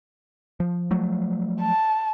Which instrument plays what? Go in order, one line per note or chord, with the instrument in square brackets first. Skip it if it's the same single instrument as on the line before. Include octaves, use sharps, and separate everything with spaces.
[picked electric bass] F3
F3 F#3 A3
[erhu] A5